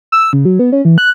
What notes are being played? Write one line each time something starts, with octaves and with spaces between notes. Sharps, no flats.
E6
C#3
F#3
B3
C#4
E3
F#6